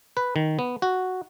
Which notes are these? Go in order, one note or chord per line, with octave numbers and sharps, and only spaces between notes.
B4
D#3
B3
F#4